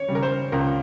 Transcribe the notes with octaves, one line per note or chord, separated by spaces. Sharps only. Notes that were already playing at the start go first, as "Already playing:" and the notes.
Already playing: C#5
C#3 G3
A#4
C5
C#2 A#4